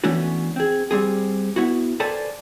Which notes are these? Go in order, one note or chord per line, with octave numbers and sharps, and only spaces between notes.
E3 A3 B3 C#4 D4 F#4
C4 G#4
G3 C4 G#4
B3 E4 F#4
A4 B4 C5 D5 G#5 A5